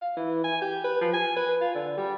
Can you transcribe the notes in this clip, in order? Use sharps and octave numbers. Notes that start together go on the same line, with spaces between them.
F5
E3
G#5
G4
B4
F3
G#5
B4
F4
D3
G3